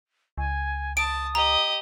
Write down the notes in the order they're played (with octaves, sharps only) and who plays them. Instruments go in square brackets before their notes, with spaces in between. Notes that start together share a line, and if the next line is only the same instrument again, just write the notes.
[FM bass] C#2 [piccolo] G#5
[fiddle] A5 [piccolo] D#6 [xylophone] D7
[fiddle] G4 D#5 [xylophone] A#5